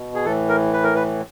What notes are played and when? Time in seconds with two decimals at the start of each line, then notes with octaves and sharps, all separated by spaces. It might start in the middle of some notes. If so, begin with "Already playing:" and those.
Already playing: B2
0.15 G#4
0.25 A2 E3 A4
0.49 A#4
0.73 B4
0.83 A#4
0.95 B4